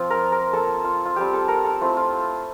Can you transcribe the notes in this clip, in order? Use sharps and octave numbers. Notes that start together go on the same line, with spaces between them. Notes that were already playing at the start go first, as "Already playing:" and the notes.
Already playing: F3 C4 F4
A#4
A#4
A#3 F4 A4
F4
F4
G3 C4 F4 G4
A4
A#4
A4
A3 C4 E4 F4
F4